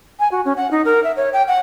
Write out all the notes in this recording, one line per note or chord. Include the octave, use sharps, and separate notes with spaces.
G#5
F#4
C#4
F#5
D#4
A#4
E5
C#5
G5
F#5